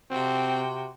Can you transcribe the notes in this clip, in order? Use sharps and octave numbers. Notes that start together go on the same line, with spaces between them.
C3 C4 F#4 G5